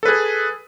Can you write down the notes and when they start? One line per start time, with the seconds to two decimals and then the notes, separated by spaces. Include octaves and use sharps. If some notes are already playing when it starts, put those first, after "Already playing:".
0.03 A4
0.05 B4
0.08 G#4